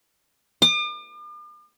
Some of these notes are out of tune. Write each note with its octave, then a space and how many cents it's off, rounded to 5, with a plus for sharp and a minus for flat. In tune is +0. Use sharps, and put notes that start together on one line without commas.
D6 +45